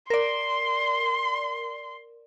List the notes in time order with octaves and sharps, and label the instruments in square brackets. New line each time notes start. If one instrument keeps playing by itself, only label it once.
[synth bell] A#4 D5 [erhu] C6